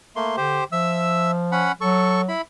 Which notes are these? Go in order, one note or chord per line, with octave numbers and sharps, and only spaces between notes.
A3 A#3 C6
D3 G4 C5
F3 E5 E6
C#4 F#5 B5
F#3 A4 C#6
E4 B5